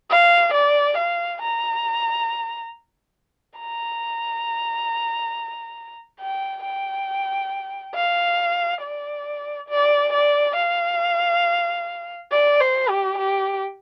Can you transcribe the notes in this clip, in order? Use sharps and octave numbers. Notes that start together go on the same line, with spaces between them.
F5
D5
F5
A#5
A#5
G5
G5
F5
D5
D5
D5
F5
D5
C5
G4
G4